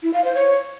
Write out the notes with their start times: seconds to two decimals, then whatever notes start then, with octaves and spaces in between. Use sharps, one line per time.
0.03 E4
0.14 F5
0.24 C5
0.35 C#5